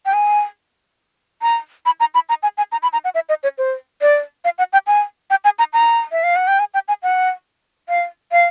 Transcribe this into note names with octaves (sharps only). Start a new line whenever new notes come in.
G5
G#5
A#5
B5
A#5
B5
A#5
G#5
G#5
A#5
B5
A#5
F#5
E5
D#5
C#5
C5
D5
F5
F#5
G5
G#5
G5
G#5
A#5
A#5
E5
F5
F#5
G5
G#5
G5
G#5
F#5
F5
F5